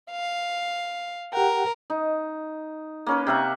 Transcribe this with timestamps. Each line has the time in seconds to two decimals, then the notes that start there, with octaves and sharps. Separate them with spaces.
0.11 F5
1.33 G4 A#4 F#5 G5
1.90 D#4
3.06 A#3 C#4 B4
3.27 C3 E5 F#5